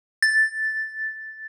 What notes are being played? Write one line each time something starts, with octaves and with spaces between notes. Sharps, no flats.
A6